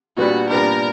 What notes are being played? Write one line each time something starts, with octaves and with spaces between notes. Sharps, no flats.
A#2 G3 B3 D4 F#4 G4
A#2 G3 B3 D4 G4 A#4